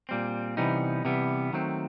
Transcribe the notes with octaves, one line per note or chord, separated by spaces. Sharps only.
A#2 G3 C4
C3 E3 G3 B3 D#4
C3 E3 G3 B3
D#3 F#3 A3 C4